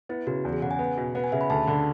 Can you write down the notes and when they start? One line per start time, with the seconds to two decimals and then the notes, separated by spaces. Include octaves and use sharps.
0.09 B3 E4
0.27 C#3 F#4
0.45 E2
0.53 G#4
0.62 C#3 F#5
0.71 G#5
0.79 B3
0.97 B2
1.15 B3 F#5
1.24 G#5
1.32 C#3 E5
1.41 B5
1.50 D2 A5
1.67 D3